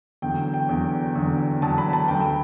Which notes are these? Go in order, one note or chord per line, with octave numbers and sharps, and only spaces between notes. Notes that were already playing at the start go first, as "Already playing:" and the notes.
E2 D3 F#3 G5
G5
E2 D3 F#3
E2 D3 F#3
E2 D3 F#3 A5
B5
A5
D2 D3 F#3 G5
G5